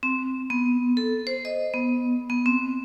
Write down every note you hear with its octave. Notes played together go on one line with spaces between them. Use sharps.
C4
B3
A4
C5
D#5
B3
B3
C4